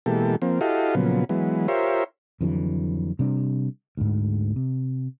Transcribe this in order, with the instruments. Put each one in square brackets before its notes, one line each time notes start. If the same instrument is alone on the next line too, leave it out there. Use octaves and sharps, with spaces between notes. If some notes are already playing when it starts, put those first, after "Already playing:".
[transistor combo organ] B2 E3 G#3 A#3 G4 A4
F3 A#3 C4
E4 F#4 G4 A4 D#5 F5
A#2 C#3 F3 F#3 B3
E3 F#3 G#3 B3
F4 G4 A#4 C5 C#5 E5
[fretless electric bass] F2 D3 E3 F#3
C3 G3 D4
D2 G#2
C3